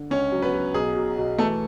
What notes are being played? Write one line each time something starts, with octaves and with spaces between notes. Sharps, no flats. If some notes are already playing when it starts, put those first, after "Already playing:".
Already playing: D3
C#2 C#4 C#5
F#3
B3 B4
F#3
B1 G#4
B2
B2
E3 A3 A4